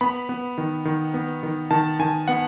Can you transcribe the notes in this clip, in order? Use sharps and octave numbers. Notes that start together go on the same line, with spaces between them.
B3 B5
B3
D#3
D#3
B3
D#3
D#3 A5
D#3 G#5
B3 F#5